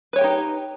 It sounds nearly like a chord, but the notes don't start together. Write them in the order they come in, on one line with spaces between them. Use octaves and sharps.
B4 C#5 G5 G4 D#4